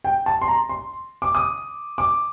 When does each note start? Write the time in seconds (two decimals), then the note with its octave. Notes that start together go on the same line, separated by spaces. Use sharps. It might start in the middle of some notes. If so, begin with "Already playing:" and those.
0.04 G5
0.26 A5
0.42 C6
0.48 A#5
0.69 C6
1.22 D6
1.35 D#6
1.98 D6